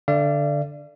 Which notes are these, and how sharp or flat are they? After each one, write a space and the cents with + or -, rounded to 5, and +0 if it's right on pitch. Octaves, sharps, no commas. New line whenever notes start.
D3 +0 D5 +0 F5 -45